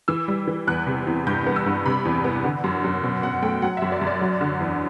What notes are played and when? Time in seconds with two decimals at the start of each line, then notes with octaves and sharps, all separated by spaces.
0.08 E3 E6
0.28 G3
0.47 E3
0.67 E2 F#6
0.87 C3
1.07 E2
1.27 G2 G6
1.46 B3
1.56 E6
1.66 G2
1.86 C3 B5
2.05 E2
2.24 B3
2.44 D3
2.64 F#2
2.84 F#2
3.03 B2
3.23 B2 F#5
3.42 A3 G5
3.62 F#3 F#5
3.77 F#2 E5
3.92 D5
4.01 F#2
4.07 D5
4.21 F#3
4.41 D3
4.60 E2